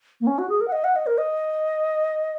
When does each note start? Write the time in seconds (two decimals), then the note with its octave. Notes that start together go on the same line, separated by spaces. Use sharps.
0.21 A#3
0.27 C#4
0.38 F#4
0.49 G#4
0.61 A#4
0.68 F#5
0.72 D#5
0.84 F#5
0.96 D#5
1.07 A#4
1.18 D#5